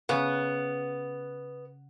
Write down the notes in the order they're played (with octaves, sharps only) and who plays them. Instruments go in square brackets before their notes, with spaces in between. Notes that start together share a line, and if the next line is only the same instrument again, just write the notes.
[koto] C#3 [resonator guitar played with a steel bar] B3